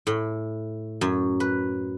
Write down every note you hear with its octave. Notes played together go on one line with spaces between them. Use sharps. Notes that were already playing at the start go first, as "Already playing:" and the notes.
A2
F#2
B4